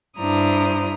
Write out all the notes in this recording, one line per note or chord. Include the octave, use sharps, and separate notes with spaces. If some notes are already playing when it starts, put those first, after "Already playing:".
G2 D4 E4 C5 A#5 D#6